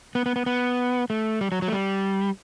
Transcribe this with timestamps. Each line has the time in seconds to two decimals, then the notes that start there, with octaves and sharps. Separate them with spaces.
0.15 B3
0.26 B3
0.36 B3
0.46 B3
1.10 A3
1.41 G3
1.52 F#3
1.62 F#3
1.68 A3
1.72 G3